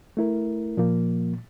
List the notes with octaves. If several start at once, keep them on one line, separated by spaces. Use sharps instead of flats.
A3 E4 A#4
A#2 F3 A#3